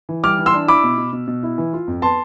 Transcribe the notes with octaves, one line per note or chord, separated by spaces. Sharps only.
E3
G3 D6 F6
E3
C6 E6
D4
E4 B5 D6
B2
B2
B2
B2
E4
E3
F4
F2
B3 A5 C6